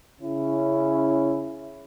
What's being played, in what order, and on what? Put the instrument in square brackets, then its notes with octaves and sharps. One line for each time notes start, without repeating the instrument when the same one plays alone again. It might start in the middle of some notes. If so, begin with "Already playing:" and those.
[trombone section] C#3 C#4 E4